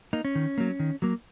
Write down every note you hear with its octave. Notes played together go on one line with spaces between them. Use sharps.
A#3 D#4
C#4
D#3
F#3 A#3
D#3
F#3 A#3